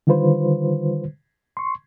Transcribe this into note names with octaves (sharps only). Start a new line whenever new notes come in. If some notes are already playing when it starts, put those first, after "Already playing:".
D3 D#3 G3 F4 B4 C5
C6 C#6